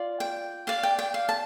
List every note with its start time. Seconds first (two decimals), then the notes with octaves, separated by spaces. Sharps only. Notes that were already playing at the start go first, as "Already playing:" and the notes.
Already playing: F4 D5
0.20 G5
0.67 G4 D5 F5
0.83 G5
0.99 G5
1.14 F5
1.29 A5